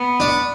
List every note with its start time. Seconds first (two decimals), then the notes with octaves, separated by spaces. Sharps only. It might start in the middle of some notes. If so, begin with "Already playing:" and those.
Already playing: B3
0.20 D4